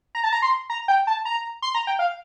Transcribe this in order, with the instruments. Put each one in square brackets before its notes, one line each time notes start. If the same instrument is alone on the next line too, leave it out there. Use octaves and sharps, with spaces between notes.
[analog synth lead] A#5
A5
A#5
C6
A#5
G5
A5
A#5
C6
A#5
G5
F5